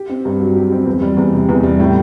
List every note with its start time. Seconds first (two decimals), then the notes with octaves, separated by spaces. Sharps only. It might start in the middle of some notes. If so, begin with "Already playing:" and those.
Already playing: G4
0.09 C4
0.25 G2
0.40 F#3
0.56 G4
0.72 C4
0.86 E2
1.02 G3
1.17 E2
1.34 C3
1.49 E2
1.63 G3
1.80 A2